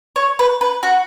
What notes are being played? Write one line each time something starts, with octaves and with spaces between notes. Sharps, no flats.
C#5
B4
B4
F#4